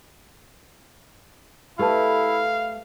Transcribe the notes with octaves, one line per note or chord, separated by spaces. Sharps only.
A3 E4 G4 B4 F5 A5